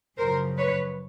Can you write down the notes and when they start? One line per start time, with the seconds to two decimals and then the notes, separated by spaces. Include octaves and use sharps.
0.18 F#2 C#3 F3 A#4 C5
0.58 B4 C#5